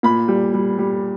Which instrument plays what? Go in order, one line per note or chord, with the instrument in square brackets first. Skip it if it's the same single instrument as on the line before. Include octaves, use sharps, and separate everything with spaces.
[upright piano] A#2 B5
G3
G3
G3